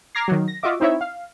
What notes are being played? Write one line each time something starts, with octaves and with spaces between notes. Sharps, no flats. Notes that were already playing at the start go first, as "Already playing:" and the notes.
A#5 D6 F6 G#6 A#6 C7
D#3 F#3
A#6
F4 F#4 D#5 E5 D6
C4 D#4 E4 C#5 E5
F5